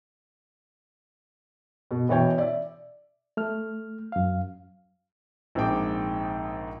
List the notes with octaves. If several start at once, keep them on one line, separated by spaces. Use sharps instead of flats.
B2
B2 E3 C#5 G5
D5 E5
A3 F6
F#2 F5
A#1 G#2 C4 G#4 G5 D6